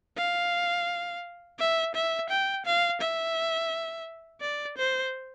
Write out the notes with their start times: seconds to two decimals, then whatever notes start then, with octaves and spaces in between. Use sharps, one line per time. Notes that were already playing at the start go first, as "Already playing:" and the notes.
0.17 F5
1.59 E5
1.95 E5
2.30 G5
2.66 F5
3.01 E5
4.41 D5
4.78 C5